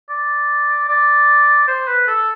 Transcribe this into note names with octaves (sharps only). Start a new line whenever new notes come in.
D5
D5
C5
B4
A4